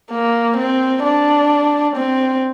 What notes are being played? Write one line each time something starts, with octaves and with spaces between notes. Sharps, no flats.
A#3
C4
D4
C4